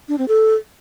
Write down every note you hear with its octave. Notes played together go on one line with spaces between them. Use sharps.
D4
C4
A4